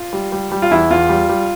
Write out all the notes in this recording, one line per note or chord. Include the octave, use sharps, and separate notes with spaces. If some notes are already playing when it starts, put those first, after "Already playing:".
Already playing: F4
G3
G3
G3
F4
E2 E4
E2 F4
G3
G3